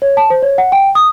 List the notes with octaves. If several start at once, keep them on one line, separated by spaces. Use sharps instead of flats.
C#5
A5
C5
C#5
F#5
G5
D#6